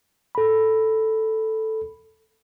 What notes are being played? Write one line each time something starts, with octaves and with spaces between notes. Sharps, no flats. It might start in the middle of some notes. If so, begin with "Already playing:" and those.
A4 B5